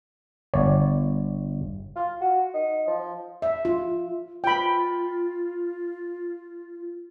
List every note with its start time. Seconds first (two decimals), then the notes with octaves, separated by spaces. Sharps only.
0.54 G1 C#5 D5
1.96 F4
2.21 F#4
2.54 D#4
2.87 F3
3.42 E5
3.65 F4
4.44 F4 G5 B5